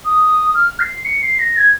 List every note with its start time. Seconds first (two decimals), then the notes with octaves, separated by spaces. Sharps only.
0.05 D#6
0.55 F6
0.80 C7
1.05 C#7
1.22 C7
1.39 A#6
1.57 G#6